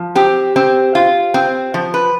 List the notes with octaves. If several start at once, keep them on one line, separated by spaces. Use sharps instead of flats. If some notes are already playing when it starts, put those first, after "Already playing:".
Already playing: F3
C4 G4
C4
F4
C4
F3
B4